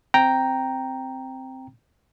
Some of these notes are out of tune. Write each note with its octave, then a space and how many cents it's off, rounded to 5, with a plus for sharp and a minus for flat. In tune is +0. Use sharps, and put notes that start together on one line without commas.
C4 +0 G5 +0 A#5 +0